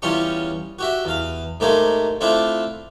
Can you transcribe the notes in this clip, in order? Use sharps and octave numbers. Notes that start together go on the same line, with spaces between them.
E2 G3 C#4 F4 G4 C#6
F#4 G4 E5
E2 F5
G#2 A3 A#3 G4 C5 G#5
A3 C4 D4 E4 F4 F5